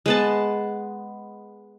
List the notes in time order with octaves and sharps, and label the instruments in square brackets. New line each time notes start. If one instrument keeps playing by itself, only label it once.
[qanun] G#3 B3 A5